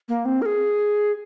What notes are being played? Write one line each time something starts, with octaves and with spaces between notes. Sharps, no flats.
A#3
C4
A#4
G#4